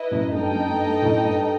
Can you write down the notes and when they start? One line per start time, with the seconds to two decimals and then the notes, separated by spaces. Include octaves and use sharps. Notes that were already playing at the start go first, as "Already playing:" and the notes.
Already playing: E4 B4 D#5
0.11 F#2 A2
0.34 G2 D#4 A4 D#5 G5
0.51 F#2
0.69 G2
0.86 G2
1.02 F#2 A2
1.25 G2